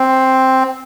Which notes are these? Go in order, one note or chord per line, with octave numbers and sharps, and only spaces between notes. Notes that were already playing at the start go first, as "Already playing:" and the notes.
Already playing: C4